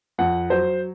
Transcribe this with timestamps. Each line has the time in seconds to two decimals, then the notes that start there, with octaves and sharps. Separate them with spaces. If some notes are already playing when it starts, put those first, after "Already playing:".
0.18 F2 F#5
0.50 F#3 C5